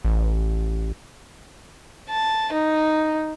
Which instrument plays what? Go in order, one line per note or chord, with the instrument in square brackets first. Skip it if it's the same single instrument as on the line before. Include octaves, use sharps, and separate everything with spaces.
[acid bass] A1
[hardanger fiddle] A5
D#4